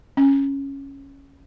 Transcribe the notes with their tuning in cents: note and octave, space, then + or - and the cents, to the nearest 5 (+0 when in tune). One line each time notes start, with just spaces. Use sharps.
C#4 -10